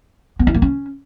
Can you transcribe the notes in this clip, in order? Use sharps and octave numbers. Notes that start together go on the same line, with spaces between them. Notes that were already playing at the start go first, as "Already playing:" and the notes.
B3
E4
A#3
C#4